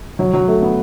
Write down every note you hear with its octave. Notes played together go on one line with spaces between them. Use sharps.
F#3
F#3
A3
B3